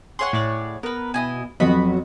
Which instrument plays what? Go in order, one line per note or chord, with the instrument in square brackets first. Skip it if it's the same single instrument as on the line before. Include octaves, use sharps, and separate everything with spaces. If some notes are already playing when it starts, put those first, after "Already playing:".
[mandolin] G#4 C#5 F#5 [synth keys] C6
[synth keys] A2 D5
[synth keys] B3 [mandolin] A#4 B4
[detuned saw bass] B2 [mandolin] E4 D#5 G#5
[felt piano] F2 D#5 [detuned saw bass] F#3 [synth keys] B3 F#4 [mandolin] B5